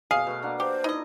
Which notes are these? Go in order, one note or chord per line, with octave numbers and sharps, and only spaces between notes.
B2 G#4 F5
B2 A3 B4
A#3 D4 F#5
G4 C5
D#4 E4 D#5